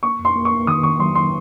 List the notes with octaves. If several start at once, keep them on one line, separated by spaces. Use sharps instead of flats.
A#3 C#6
F2
C6
A#3
C#6
A#3
D#3 D#6
D#3 C#6
F#3 C6
C6